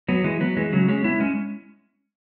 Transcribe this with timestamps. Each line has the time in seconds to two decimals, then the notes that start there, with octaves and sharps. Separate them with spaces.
0.08 F#3 B3
0.24 E3 G#3
0.40 F#3 B3
0.57 E3 G#3
0.72 C#3 F#3
0.88 G#3 C#4
1.04 B3 E4
1.20 G#3 C#4